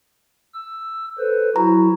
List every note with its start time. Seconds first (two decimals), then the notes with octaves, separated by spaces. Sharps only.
0.54 E6
1.18 A4 B4 C5
1.56 F#3 E4 F#4 A#5